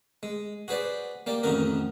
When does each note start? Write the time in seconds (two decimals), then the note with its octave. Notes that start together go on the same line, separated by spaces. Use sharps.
0.23 G#3
0.68 F#4 G#4 B4 C5 D5
1.27 A#3 G4 D5
1.43 A1 F2 D#3 D#4 F#4 A#4